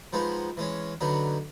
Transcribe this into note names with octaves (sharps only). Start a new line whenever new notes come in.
F3 G#3 B3 D#4
E3 G#3 C#4
D3 F#3 B3 D#4